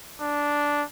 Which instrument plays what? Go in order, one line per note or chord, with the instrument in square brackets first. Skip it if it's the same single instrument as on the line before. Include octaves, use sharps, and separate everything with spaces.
[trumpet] D4